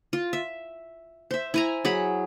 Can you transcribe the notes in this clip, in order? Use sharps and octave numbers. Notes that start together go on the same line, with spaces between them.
F4
E5
C5 E5
E4 G#5 A#5
F#3 G#4 B5